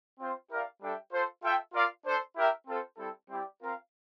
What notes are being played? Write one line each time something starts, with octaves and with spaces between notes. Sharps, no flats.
C4 F4 C5
E4 G4 A#4 D5 F5
G3 D4 A4 E5 G5
F4 A4 C5
F4 A4 E5 G5
F4 A#4 D5 F5
D4 A4 C5
E4 G4 A#4 E5 G5
C4 F4 A4 C5
G3 C4 E4 A4
G3 C4 E4 G4 D5
C4 F4 A#4 F5